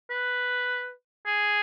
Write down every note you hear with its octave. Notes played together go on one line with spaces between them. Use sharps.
B4
G#4